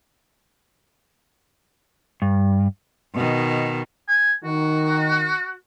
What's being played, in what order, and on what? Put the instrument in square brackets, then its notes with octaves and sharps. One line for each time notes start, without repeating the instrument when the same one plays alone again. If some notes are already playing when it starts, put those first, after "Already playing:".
[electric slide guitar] G2
[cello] B2 D#3
[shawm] G#5
[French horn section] D#3 [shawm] F#4